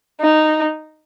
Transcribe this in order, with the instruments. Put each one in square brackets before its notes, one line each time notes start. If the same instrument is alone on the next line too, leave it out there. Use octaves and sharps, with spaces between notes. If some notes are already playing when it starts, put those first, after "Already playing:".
[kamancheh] D#4